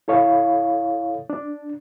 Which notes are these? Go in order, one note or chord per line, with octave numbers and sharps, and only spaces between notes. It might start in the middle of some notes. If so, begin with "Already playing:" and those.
E4 A4 C#5 F5
D4